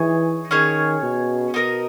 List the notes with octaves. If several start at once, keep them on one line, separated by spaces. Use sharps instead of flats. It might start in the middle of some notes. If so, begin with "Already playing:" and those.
Already playing: E3 D#4 G#4 C#5
D#3 C#4 G#4 C#5
B2
B2 D#4 A#4 D#5